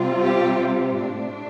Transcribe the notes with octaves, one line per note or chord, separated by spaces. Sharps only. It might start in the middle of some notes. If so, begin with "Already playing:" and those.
Already playing: C3 G3 C4 F4
G4
A2 A3 D4